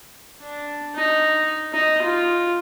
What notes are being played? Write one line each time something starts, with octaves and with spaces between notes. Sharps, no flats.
D4
D#4
D#4
F4